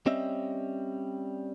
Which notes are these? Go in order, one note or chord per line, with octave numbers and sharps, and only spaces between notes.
G3 C4 C#4 D#5 E5